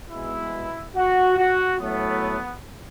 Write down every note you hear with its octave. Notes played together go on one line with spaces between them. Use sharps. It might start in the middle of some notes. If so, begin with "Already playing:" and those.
B2 G#3 E4
F#4
F#4
A2 F#3 A3 B3